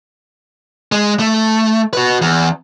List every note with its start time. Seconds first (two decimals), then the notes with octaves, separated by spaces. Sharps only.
0.92 G#3
1.20 A3
1.93 F#4 B4
2.21 E2